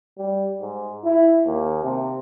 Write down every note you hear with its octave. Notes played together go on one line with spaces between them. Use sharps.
G3
G#2
E4
D#2
C3